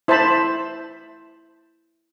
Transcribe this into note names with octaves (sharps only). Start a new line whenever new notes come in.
E4 C5 E5 A5 B5